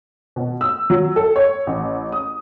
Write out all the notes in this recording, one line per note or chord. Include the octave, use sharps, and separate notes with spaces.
B2
E6
F#3
A4
C#5
A1
D#6